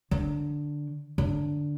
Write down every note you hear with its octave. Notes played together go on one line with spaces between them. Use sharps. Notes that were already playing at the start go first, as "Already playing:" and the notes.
D3
D3